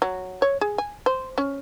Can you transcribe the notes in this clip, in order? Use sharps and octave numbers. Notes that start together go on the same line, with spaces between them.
F#3
C#5
G#4
G#5
C5
C#4